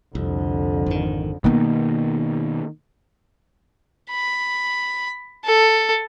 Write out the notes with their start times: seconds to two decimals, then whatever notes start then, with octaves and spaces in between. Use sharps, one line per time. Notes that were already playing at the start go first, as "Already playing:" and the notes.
0.15 C2 F2 D3
0.86 G#1 D#3
1.44 B2 D#3 A#3 B3
4.11 B5
5.45 A4